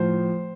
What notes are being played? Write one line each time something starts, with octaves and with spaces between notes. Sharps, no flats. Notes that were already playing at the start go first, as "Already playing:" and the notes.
Already playing: A2 F3 C5